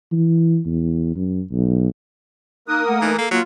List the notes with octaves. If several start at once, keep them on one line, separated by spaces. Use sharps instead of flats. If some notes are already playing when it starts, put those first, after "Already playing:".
E3
E2
F#2
B1
A#3 D#4 A#4 D#6 F#6
A3 F#5
E3 D#4
A#3 A4
F#3 A#3 F4